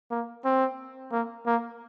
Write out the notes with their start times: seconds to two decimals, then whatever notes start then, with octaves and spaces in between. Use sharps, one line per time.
0.11 A#3
0.45 C4
1.12 A#3
1.46 A#3